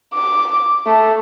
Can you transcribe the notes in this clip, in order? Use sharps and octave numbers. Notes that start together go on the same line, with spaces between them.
D6
A3